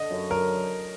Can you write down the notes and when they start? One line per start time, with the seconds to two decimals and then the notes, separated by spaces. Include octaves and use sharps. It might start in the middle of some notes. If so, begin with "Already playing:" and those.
Already playing: D3 D#5
0.11 F#2
0.30 F#2 A#4